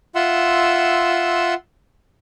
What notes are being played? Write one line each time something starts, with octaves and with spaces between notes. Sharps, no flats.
F4 E5 F#5 C6 E6